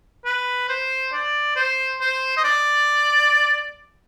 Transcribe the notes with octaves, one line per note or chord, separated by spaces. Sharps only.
B4
C5
D5
C5
C5
D#5
D5